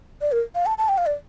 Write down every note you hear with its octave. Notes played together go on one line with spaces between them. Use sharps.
D5
A#4
F5
A5
A5
G5
F5
D5